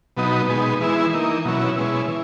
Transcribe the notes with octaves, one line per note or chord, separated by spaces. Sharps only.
B2 F#3 B3 D#4
B2 G#3 B3 D#4
E3 G#3 B3 E4
E3 A#3 D#4
B2 F#3 C#4 E4
B2 G#3 C#4 E4
E3